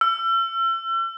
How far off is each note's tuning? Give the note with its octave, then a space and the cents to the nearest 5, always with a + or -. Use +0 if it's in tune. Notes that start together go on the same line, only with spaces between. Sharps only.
E6 +40